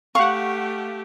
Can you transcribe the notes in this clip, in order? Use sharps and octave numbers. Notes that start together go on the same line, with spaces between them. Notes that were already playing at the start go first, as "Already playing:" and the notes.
A3 G4 F5 F#5 C#6